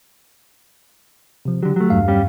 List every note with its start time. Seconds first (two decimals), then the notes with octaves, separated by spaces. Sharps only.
1.45 C3 F3
1.63 D3 F#3 G4
1.76 F#3 A3
1.90 E2 G2 F5
2.08 G3 C#4 G4